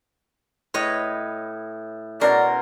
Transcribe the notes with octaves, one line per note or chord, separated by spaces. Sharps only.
A2 B4 C#5 D#5
B2 C#4 A#4 D5 C6